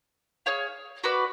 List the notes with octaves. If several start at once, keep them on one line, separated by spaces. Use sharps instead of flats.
G#4 C#5 F5
F#4 B4 D5